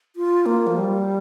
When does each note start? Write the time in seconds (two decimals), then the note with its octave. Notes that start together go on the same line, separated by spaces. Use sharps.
0.16 F4
0.46 A#3
0.67 F3
0.76 G3